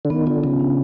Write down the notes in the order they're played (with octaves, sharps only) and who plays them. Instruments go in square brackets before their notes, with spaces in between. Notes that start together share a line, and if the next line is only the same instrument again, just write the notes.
[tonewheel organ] D3
[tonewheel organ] D#3 [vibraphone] B3
[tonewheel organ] D3 [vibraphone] F4
[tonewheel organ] C#3 [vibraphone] F#3
[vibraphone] D4